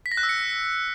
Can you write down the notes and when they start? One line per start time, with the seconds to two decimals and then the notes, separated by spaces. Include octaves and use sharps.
0.06 B6
0.12 A#6
0.17 F#6
0.23 E6
0.29 C#7